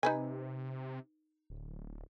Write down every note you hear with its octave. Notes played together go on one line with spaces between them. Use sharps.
C3 D#4 B4 G#5
D1